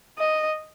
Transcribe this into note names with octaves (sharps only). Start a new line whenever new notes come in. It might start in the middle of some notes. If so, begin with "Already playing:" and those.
D#5